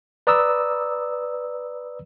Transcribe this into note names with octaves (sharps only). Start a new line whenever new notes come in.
B4 D5 A#5 D#6 E6